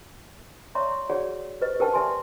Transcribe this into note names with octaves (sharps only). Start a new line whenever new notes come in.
C#5 D5 E5 A#5 C6 C#6
F#4 G#4 C#5 D5 F#5
G4 B4 C5 D#5
G4 A#4 B4 F#5 G5 A5
B4 D5 E5 G#5 A5 C6